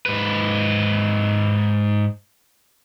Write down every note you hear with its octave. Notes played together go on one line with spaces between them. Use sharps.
G#2 B4